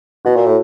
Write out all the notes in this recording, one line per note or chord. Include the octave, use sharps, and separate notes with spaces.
B2 F#4
A#2
A2